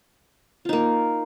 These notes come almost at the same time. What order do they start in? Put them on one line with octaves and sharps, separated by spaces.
F4 D#4 A#3